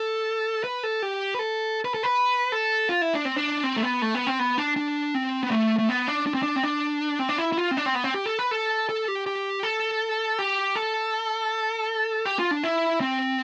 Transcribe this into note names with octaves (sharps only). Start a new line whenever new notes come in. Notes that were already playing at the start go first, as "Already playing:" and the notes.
Already playing: A4
B4
A4
G4
B4
A4
B4
A4
B4
A4
F4
E4
D4
C4
D4
C4
A3
B3
A3
B3
C4
B3
D4
D4
C4
B3
A3
A3
B3
D4
D4
C4
D4
C4
D4
C4
D4
E4
E4
F4
C4
D4
C4
B3
C4
G4
A4
B4
A4
A4
G4
G4
A4
G4
A4
G4
F4
D4
E4
C4